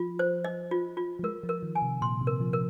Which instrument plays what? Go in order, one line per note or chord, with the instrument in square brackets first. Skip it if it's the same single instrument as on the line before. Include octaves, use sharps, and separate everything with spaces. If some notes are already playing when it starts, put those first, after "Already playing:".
Already playing: [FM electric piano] F3 [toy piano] F4
[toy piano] C5
D#5
F4
F4
[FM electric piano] F3
[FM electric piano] G#3 [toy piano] A#4
[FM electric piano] F3
[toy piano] A#4
[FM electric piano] D#3
[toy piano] G#5
[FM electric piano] C3
[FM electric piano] A#2 [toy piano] C6
[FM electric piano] C3
[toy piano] A#4
[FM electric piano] F3
[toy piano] A#4